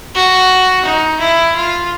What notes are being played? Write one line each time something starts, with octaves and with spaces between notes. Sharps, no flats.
F#4
D#4
E4
F4